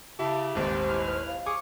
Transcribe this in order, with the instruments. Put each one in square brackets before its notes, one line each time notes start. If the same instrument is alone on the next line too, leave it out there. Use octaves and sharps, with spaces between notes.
[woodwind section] C#3 [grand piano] E4 [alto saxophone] G4 [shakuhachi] A5
[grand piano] D#1 G#1 [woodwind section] C#3 E3 D5 [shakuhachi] C5
[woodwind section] E4 B4 F6
[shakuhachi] F5
[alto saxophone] G#4 [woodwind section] C#6 [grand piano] D6